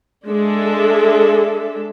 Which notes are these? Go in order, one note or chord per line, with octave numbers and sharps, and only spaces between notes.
G#3 D4 A4 E5